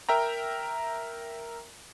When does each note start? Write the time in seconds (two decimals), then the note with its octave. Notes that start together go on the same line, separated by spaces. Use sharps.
0.09 A#4 E5 G5 A#5